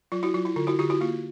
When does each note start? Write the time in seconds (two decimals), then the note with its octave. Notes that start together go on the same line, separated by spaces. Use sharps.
0.12 F#3 F4
0.23 E4 F#4
0.34 F#3 F4
0.45 E4
0.56 D3 F4
0.67 E4 F#4
0.79 D3 F4 G4
0.90 E4 F#4
1.01 A#3 F4